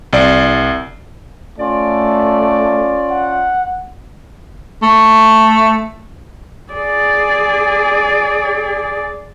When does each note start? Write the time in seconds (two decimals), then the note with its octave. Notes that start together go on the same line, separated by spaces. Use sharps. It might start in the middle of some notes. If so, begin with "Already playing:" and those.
0.13 C2 D5
1.58 A3 C#4 F4 D5
3.11 F#5
4.82 A3
6.73 G#4 D5